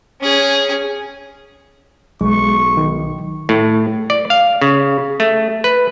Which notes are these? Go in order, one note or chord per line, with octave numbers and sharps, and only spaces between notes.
C#4 G#4
B1 G#3 C#6
D#3
A2
D5
F5
C#3
A3
B4